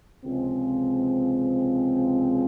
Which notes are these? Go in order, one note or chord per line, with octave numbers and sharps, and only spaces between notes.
C#2 C3 F3 G#3 C4